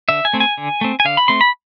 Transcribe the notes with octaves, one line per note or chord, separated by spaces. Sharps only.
D3 E5
G#5
A3 C4
G#5
D3
A3 C4
G#5
D3 F5
B5
A3 C4 C6
B5